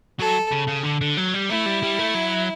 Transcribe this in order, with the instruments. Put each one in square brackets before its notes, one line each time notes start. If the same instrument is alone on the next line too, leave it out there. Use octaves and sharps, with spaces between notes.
[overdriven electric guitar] F#3 [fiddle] A4
[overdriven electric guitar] C#3
C#3
D3
D3
F#3
G3
[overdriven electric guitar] A3 [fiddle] E4
[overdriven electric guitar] G3
G3
A3
F#3